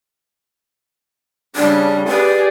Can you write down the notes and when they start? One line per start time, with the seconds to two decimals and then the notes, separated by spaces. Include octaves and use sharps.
1.56 C#3 G3 C#4 D4
2.08 G4 G#4 B4 D5